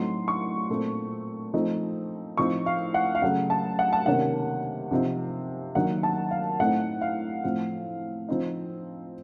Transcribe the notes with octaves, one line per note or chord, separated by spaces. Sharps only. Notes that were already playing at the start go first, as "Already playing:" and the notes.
Already playing: A2 F#3 A3 C4 D#4 C6
C#6
A#2 A3 C4
F3 A3 C4 D#4
A2 F3 C4 D#4 C#6
F5
F#5
F5
C#3 F#3 A3 F#5
A5
F#5
A5
C3 D#3 A#3 C#4 F#5
C3 F3 C4 D#4
D#3 F#3 A#3 F#5
A5
F5
A2 A3 C4 D#4 F#5
F5
A2 F3 C4
F3 C4 D#4